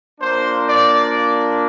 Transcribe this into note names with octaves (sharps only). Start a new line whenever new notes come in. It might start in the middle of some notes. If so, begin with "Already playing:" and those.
A#3 D4 F4 C5
D5